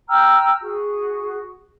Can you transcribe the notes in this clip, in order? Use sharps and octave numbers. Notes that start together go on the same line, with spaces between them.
G5 A#5 E6 F6
F#4 G#4